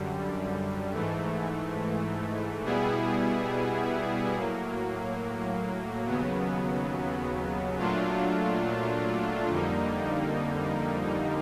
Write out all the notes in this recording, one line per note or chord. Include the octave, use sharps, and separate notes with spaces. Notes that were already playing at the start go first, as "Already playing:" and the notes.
Already playing: F#2 D3 G3
G#2 E3 A3
B2 G3 B3 E4 G#4
A2 F#3 A#3
D#2 C#3 F#3 B3
A#2 F#3 A3 D4 F4
F2 D3 G3 A#3 D#4